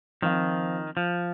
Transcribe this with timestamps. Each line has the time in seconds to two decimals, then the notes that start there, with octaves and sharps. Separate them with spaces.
0.22 D#3 F3 C4 F4
0.97 F3